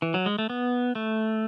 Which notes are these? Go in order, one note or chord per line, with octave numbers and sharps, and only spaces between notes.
E3
F#3
G#3
A3
B3
A3